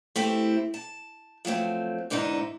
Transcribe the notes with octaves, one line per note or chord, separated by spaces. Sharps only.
A3 C4 E4 G4
A5
F3 F#3 A3 C4
E2 G#2 D3 D#4 E4